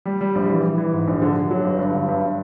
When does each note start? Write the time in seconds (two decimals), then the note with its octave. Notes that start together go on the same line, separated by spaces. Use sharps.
0.05 G3
0.21 G3
0.35 A#1
0.48 E3
0.63 E3
0.78 E3
0.93 G#2
1.07 A#1
1.22 D3
1.36 D3
1.51 F#3
1.64 G1
1.79 G2
1.94 G1
2.08 G2